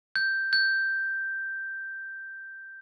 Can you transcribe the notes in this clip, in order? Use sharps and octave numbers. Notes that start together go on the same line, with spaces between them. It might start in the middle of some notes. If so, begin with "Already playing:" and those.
G6
G6